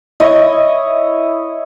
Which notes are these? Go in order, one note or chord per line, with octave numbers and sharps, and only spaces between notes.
E4 C#5 D#5